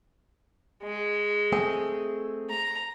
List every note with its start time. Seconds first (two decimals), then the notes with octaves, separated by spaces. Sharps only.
0.83 G#3
1.52 A3 C4 G#4
2.50 A#5